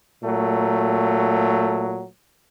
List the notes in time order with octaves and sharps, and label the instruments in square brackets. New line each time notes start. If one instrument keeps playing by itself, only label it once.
[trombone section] A#2 F#3 A3